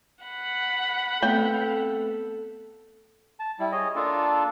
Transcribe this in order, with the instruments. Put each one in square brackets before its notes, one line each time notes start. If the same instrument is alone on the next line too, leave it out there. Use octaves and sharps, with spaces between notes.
[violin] F#5 B5
[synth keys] A3 B3 C4 [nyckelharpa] A4 [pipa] G5
[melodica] A5
G3 E4
G#4 C#5 D#5
A#3 D4 F4 A4